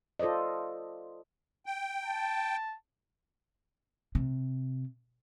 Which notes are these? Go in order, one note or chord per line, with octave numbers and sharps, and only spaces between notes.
F4 A4 C5 D5 D#5
G5
A5
C3